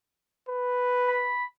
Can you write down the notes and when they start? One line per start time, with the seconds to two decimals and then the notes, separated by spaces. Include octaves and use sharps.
0.49 B4
1.08 B5